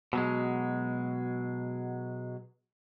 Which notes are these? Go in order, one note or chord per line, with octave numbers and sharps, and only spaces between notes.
B2 F#3 G#3